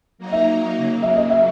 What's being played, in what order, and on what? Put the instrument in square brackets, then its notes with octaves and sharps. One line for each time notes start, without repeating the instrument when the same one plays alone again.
[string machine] F#3 A#3 D#4 A#4
[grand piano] E5
[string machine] C#3 F#3 A#3
[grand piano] E5
D#5
E5